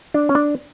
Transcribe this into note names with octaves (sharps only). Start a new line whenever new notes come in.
D4
C#4
D4